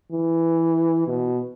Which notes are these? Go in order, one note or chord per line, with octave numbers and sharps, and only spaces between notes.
E3
B2